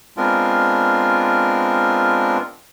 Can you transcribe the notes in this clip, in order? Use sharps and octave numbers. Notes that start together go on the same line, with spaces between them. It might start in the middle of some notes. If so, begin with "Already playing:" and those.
G#3 B3 C4 D4 F4 A#4